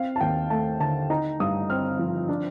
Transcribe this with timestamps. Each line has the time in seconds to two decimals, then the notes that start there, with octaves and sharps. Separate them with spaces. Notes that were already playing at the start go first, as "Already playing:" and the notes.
Already playing: C4 F5
0.16 A5
0.21 D#2 G5
0.50 A3 A5
0.80 D3 A5
1.10 D#4 A#5
1.40 G2 D#6
1.70 C4 F6
1.99 F3
2.29 D4